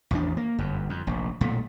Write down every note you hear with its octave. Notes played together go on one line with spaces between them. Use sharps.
A1 E2 D#3 D4
A#3
G1 F#2
F2
F1 A#1
B1 A#2 A3